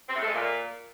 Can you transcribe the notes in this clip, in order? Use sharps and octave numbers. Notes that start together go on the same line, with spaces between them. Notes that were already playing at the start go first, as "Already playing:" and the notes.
C4
A2
A3
G#3
A#2